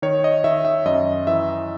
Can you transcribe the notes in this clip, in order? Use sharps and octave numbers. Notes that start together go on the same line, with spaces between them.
D#3 C#5
D#5
D#3 E5
E5
F#2 D#5
E3 E5